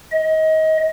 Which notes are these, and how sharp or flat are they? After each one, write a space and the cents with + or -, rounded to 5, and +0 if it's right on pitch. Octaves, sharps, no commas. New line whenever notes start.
D#5 +25